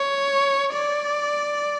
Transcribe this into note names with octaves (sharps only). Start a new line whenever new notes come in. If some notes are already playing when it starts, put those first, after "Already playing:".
Already playing: C#5
D5